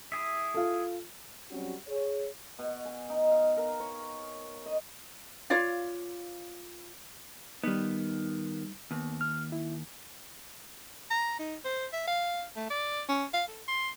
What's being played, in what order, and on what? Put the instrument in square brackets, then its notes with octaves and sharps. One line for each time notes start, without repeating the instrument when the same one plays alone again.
[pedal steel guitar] E4 G#4 E5
[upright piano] F4 A4
[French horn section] F#3 G3 C4 C#4 F#4
G#4 C#5
[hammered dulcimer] B2
G#5
D#4
F5
A#4
C#5
D#5
[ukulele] F4 C#5 D5 F5
[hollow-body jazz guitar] D#3 B3 [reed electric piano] G3 D#4
[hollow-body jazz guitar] D#2 [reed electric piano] B3
[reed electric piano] F6
E4
[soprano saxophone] A#5
D#4
C5
E5
F5
A3
D5
C#4
F5
A4
C6